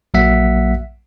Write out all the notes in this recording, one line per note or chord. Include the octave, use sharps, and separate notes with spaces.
A#1 F#3 A#3 E5 F#5 B6